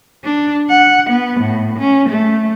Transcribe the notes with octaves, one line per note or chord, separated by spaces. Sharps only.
D4
F#5
B3
A2
C#4
A3